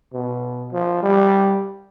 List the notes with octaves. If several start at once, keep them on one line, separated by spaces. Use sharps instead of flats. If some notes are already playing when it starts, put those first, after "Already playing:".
B2
F3
G3